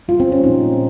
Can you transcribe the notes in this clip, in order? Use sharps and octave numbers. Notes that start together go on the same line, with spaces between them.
C3 G3 A#3 F4
C4
C#4
A#2 F3 G#3 D#4